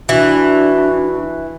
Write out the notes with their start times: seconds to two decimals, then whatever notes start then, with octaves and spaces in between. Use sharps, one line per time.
0.09 E3 D4 F#4